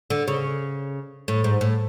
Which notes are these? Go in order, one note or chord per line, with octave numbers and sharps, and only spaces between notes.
D3
C#3
A2
G#2
A2